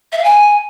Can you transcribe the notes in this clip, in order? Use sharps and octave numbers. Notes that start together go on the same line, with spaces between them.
E5
F5
G#5